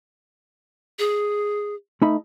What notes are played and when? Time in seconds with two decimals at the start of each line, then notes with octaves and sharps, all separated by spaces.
0.99 G#4
2.02 A3 D#4 B5